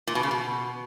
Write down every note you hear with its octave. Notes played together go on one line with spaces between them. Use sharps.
A#2
B2
C#3
B2